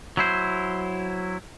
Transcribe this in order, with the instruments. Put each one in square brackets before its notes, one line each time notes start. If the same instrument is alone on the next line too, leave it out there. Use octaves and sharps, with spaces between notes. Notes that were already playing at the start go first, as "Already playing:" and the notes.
[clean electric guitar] F#3 E4 C5